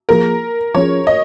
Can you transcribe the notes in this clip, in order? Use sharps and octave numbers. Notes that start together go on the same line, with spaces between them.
F3 A#3 F4 G#4 A#4
F3 C#4 G#4 C#5
D#5